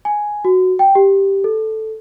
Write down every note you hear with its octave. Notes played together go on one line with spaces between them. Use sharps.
G#5
F#4
G5
G4
A4